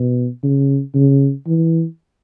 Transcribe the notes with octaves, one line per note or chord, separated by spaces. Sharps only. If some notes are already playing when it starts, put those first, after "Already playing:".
Already playing: B2
C#3
C#3
E3